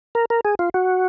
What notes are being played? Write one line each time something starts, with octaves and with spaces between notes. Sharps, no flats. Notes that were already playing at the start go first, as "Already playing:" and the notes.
A#4
A#4
G#4
F4
F#4